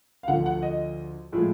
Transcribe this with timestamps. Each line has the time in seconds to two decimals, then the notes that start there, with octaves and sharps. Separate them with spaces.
0.23 F5
0.28 D2 D3 F3 F#5
0.46 F#5
0.62 D#5
1.32 A2 F3 G#3